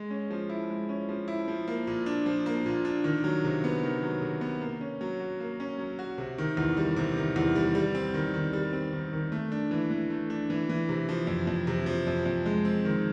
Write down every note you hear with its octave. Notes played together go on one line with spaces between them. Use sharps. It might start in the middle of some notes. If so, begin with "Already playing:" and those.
Already playing: G#3
C#4
F3
E4
G#3
C#4
F3
E4
F3
A#3
A#2
D4
F3
A#3
A#2
D4
D#3
F#3
C3
B3
D#3
F#3
C3
B3
A#3
C#4
F#3
F#4
A#3
C#4
F#3
F#4
C3
D#3
E2
G3
C3
D#3
E2
G3
G3
C4
D#3
D#3
G3
C4
D#3
D#3
A3
D4
E3
E3
A3
D4
E3
E3
C3
F3
F2
F2
C3
F3
F2
F2
G#3
C4
D#3